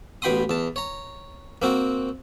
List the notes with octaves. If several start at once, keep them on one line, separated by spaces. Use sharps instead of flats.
A1 B2 G5 B5 C6 D#6
E2 A5
C#5 A#5
A#3 C4 F#4